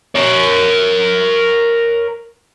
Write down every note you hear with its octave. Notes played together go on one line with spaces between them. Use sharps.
A#4 C#5